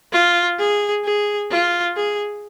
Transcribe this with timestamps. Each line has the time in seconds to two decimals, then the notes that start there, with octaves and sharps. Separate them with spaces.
0.13 F4
0.59 G#4
1.04 G#4
1.51 F4
1.96 G#4